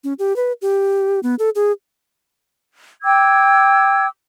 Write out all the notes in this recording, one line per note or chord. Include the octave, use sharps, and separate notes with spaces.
C#4
G4
B4
G4
B3
A4
G#4
G5 D6 E6 G#6